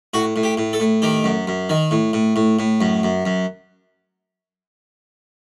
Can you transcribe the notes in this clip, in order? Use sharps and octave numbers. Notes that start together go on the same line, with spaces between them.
A2 F#4
A2
G4
A2
A4
A2
D#3 G4
F#2
F#2
D#3
A2
A2
A2
A2
F#2
F#2
F#2